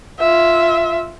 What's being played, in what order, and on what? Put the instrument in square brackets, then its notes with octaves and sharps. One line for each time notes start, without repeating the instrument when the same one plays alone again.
[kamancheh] F4 E5